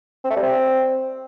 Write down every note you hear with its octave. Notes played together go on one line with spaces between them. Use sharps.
C4
A3
G3
C4